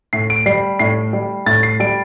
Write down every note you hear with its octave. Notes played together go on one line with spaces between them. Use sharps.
A2 C7
D7
G3 C7
A2 C7
G3
A2 A6
C7
G3 D7